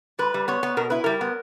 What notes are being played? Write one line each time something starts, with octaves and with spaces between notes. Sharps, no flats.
G3 B4
G3
B3 C#5
B3
B2 A#4
E4 B4
G3 A#4
B3